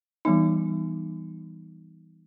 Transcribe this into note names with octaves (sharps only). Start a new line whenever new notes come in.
E3 G3 B3 D#4